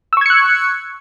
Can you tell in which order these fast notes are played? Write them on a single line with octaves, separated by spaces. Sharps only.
E6 C#6 G#6 C#7 F#6